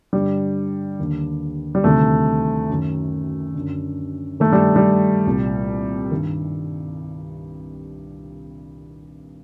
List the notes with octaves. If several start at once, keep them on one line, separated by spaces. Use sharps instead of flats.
G2 D3 G3
D#2 D3
G3
D2 C3 D#3 A3
F#2 D#3
F#2 D3
G2 D#3 A3
G3
G3
C2 A#2
G2 D#3